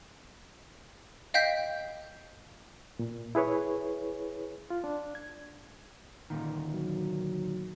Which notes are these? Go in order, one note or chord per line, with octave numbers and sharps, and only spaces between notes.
D#5 F5 G5 G6 B6
A#2
E4 G#4 B4 C#5
F4
D4
G#6
D2 A#2 D#3
F#3